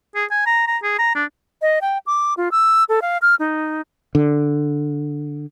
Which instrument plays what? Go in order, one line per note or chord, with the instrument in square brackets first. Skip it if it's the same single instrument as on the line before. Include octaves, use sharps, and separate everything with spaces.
[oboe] G#4
G#5
A#5
A#5
G#4
A#5
D4
[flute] D#5
G5
D6
F4
E6
A4
F5
F6
D#4
[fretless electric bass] D3